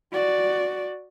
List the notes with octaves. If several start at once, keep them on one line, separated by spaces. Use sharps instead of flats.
F#4 D5